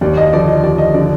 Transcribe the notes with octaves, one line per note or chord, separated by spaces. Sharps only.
D#2 D5
D#5
D3 F3 D5
D#5
D#2 D5
D#5
D3 F3 D5